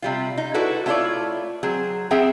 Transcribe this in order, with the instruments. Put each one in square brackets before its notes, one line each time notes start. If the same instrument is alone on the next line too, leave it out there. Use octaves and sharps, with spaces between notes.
[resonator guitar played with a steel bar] C3 G3 F4
D#4
E4 F#4 A4 B4 D5
A3 B3 E4 F4 C#5 D5
F#3 C4 G#4
C4 G#4 E5 F#5 G5 A#5